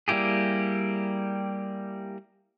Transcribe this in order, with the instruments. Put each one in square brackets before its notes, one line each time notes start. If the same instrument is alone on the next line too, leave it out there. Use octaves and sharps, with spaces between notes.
[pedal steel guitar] G3 A#3 E4 G4 G#4